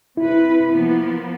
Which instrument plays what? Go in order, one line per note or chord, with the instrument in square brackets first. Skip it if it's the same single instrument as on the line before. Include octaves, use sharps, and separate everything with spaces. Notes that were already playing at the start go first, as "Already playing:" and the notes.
[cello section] C3 B4 [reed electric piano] E4
[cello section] F3 A#3 B3